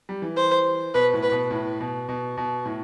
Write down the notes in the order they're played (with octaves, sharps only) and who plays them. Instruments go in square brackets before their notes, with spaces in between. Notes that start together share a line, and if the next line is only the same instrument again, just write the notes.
[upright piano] G3
E3
[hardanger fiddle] C5
[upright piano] B2 [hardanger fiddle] B4
[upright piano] A2
[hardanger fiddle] B4
[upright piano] B2
A2
B2
B2
B2
A2